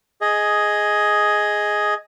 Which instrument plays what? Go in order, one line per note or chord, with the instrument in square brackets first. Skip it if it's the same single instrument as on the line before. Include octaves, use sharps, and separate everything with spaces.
[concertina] G#4 D#5